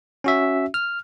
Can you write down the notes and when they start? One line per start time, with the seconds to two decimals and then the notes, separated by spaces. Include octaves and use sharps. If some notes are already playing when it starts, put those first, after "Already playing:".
0.24 C#4 F#4 E5
0.74 F6